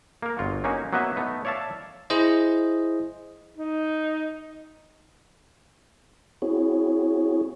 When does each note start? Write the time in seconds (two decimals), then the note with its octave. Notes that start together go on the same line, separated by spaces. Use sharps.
0.22 A#3 A#4
0.38 G1 F4 F#4
0.64 A#3 C#4 D#4 F#4 G#5
0.93 F#3 A#3 B3 B4 D#5 E5
1.16 A3 B3 D#4
1.45 C#5 D5 E5 F5 A5
2.10 E4 G#4 C5 D#5
3.57 D#4
6.42 C4 E4 F#4 G#4 C#5